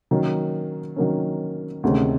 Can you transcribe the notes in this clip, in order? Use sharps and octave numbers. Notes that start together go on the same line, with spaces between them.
D#3 F#3 A#3 C#4
D#3 F#3 A#3 C#4
D2 C3 D#3 G#3 C#4